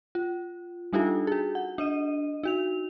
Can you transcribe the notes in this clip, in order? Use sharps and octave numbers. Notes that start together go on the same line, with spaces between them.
F4
G3 D4 D#4 F4 G4 A4
F#4 G#4
F#5
D4 D#5 D#7
D#4 F#4 F7